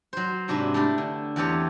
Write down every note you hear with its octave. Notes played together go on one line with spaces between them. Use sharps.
F#3 C5
G#2 C3 D4 F#4 B4 E5
A3 D4 E4 G4 A4 A#4
D3
E2 E3 C4 G4 A4 C#5